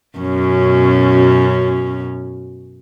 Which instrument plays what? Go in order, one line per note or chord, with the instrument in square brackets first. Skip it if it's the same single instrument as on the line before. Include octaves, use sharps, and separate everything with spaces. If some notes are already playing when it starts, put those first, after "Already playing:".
[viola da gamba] F#2 B2 C#4